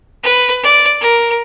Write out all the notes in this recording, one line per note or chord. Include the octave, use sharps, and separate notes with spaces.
B4
D5
A#4